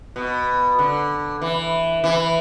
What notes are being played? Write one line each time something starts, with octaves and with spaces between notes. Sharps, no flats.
B2
D3
E3
E3